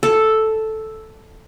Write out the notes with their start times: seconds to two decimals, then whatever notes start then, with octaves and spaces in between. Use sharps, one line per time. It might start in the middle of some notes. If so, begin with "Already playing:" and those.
0.03 A4